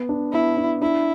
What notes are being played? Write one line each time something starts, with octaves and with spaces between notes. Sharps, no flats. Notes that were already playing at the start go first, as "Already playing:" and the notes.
Already playing: B3
D4
B3 E4
D4
D4 E4